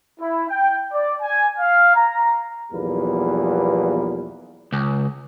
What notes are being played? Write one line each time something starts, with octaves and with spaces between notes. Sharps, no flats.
E4
G5
D5
G#5
F5
A#5
B1 E2 F3 G3 A#3 B4
C#2